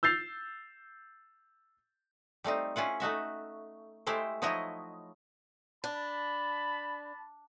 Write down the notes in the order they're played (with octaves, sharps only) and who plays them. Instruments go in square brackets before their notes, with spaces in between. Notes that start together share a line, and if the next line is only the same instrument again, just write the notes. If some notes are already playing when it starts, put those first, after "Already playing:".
[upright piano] E6 G6 A6 C7 F7
[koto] G3 A3 C4 D#4
C#4 E4 F4 F#5
A3 D#4 F#4 E5
G#3 A3 E4 G4 C5
F3 F#3 D#4 E4 C#5 D#5
[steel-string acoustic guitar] D4 [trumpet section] A5 B5